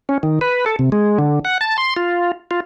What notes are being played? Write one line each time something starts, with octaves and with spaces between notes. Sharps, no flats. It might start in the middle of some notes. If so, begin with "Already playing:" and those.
C#4
D#3
B4
A4
C3
G#3
D3
F#5
A5
C6
F4
F4